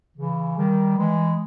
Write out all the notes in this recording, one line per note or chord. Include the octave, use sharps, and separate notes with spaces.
C#3 E3
D#3 G3
E3 G#3